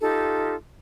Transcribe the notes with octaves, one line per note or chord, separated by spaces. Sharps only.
D#4 F4 G4 A4